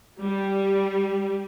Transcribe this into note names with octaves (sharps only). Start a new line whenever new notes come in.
G3